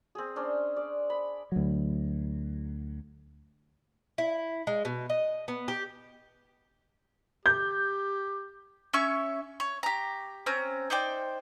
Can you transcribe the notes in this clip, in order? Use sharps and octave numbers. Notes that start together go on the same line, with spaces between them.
C4 G#4
C#4 D4 C5
D5
B5
D2 F#3
E4
G#3
B2
D#5
B3
G4
G4 G6
C#4 C#5 E5 C#6
C#5
G4 A#5
C4 C#4 A#5
D#4 C5 D5 G5